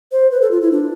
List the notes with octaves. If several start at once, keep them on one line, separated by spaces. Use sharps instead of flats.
C5
B4
A4
F4
E4
D4